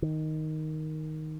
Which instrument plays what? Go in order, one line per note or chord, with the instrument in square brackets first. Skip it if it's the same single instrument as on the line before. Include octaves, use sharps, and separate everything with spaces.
[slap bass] D#3